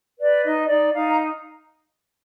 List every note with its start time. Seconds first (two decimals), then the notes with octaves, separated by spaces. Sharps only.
0.19 B4 D5
0.44 D#4 D#5
0.68 D#4 D5
0.93 D#4 F5
1.10 A#5